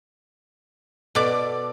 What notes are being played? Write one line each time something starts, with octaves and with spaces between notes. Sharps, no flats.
B2 A4 D5 D6